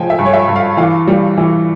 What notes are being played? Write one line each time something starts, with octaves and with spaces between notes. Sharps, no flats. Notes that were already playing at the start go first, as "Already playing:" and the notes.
Already playing: F3 G#3 G5 G#5
E5
G2
C#5
E5
G2
F5
E3 F5
G3
E3